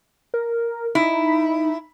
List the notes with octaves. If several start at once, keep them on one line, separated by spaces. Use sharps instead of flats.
A#4
D#4 E4